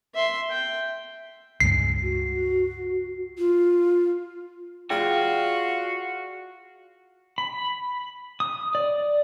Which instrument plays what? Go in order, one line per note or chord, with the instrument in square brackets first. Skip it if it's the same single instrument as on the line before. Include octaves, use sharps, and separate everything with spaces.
[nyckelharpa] E5 C6
G5
[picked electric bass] C#2 G2 G#3 [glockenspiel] C7
[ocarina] F#4
F4
[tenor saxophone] F4 [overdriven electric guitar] F#4 [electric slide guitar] G#4 D5 G5
[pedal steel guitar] B5
D#6
D5